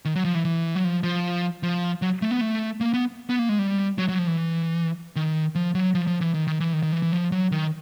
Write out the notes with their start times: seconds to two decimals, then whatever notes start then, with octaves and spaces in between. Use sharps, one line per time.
0.05 D#3
0.15 F#3
0.25 F3
0.35 E3
0.45 E3
0.75 F#3
0.84 F3
1.03 F3
1.63 F3
2.02 F#3
2.22 A3
2.31 B3
2.41 A3
2.81 A#3
2.94 B3
3.30 B3
3.39 A#3
3.49 G#3
3.59 G3
3.98 F#3
4.08 F#3
4.18 F3
4.27 E3
5.16 D#3
5.55 F3
5.75 F#3
5.95 F3
6.07 F3
6.21 E3
6.34 D#3
6.47 D#3
6.60 E3
6.73 D#3
6.83 D#3
6.92 E3
7.03 E3
7.12 F3
7.32 F#3
7.52 D#3